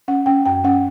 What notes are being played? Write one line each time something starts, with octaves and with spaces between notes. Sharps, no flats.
C#4 F#5
C#4 G5
F#2 G5
C#4 F#5